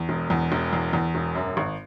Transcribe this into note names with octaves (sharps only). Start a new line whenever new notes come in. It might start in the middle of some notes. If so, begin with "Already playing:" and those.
Already playing: E2
E1
E2
E1
E2
E2
E1
F#2
G#1